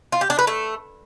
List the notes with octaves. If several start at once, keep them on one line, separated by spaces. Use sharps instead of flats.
F4
G4
D4
B4
A3